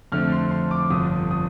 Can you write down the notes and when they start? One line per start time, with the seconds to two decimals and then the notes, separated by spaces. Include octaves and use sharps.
0.12 F2 D3 A3 C4 F6
0.32 C6
0.51 C6
0.71 D6
0.90 G1 F2 D3 D#6
1.31 D#6